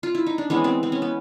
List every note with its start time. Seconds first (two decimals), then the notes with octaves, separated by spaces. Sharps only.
0.03 F4
0.15 E4
0.27 D#4
0.38 D4
0.50 E3 G#3 B3 C#4
0.64 C4
0.83 C4
0.92 C#4
1.02 B3